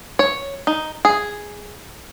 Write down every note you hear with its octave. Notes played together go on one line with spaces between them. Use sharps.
C#5
D#4
G#4